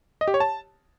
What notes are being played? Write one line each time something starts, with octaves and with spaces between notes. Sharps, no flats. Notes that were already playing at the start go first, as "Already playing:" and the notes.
D#5
G4
C#5
A5